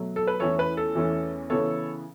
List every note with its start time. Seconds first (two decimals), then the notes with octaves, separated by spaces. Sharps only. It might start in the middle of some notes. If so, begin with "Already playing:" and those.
Already playing: B2 F#3 A3
0.16 A4
0.27 B4
0.40 E2 E3 A3 C#4 A4 C#5
0.59 B4
0.77 A4
0.95 E2 E3 A3 C#4
1.50 C#3 E3 B3 A4 C#5